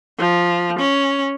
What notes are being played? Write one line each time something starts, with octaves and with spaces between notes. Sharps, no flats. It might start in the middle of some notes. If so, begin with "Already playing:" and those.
F3
C#4